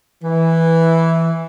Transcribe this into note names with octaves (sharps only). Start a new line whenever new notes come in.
E3